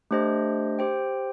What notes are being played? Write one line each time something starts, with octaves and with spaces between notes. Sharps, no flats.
A3 D4 G4 C5 D#5
G4 C5 G5